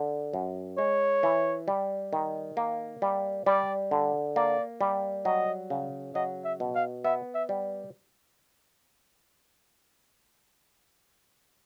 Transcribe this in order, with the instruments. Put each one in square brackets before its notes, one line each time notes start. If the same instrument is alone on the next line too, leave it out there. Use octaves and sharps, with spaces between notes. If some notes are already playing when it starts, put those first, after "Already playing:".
Already playing: [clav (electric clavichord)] D3
F#2
[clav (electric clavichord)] G#3 [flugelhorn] C#5
[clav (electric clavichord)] E3
G3
D#3
A#3
G3
[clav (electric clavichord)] G3 [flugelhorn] D5
[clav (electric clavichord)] D3
[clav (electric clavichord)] A#3 [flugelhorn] D5
[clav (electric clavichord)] G3
[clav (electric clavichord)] F#3 [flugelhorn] D#5
[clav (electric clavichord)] C#3
[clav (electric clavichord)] F#3 [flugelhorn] D#5
[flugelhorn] E5
[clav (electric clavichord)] B2
[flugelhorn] F5
[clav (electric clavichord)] B3 [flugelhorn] E5
[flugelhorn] E5
[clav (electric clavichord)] G3